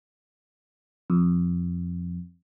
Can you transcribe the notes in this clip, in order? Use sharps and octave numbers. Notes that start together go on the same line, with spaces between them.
F2